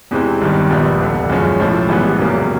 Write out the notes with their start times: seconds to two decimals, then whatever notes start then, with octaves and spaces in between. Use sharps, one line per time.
0.11 E2 C3 E3 G#3 C4
0.41 G#1 G2 D#3 G3
0.70 A#1 A#2 G3 B3
1.00 F1 D#2 D3
1.30 F#2 C#3 F3 G#3 C#4
1.60 B1 A2 F3 A3
1.89 A1 G#2 E3 G3 B3
2.19 F1 E2 C#3 F#3 A#3